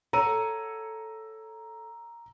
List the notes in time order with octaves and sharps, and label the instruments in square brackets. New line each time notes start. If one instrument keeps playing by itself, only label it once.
[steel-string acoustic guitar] A4 C#5 F#5 [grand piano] A#5 E6 D#7